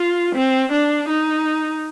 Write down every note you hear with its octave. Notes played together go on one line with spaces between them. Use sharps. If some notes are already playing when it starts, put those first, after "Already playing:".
Already playing: F4
C4
D4
D#4